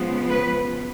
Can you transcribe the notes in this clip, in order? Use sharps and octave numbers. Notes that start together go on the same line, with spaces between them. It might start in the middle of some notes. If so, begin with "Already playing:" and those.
Already playing: C#3 F3 G#3 B3
B4